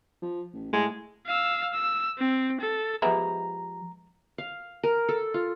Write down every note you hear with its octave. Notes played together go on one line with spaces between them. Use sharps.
F3
A1
A2 G#3
F5 E6
E6
C4
A4
F3 G#3 B3 E4 G4 A#5 B5
F5
A#4
A4
F4